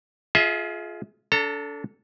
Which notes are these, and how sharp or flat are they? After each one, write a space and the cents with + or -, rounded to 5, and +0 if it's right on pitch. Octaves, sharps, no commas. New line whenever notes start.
F4 +0 G#4 +30 E5 -35
D4 -35 A4 +0 A#5 -35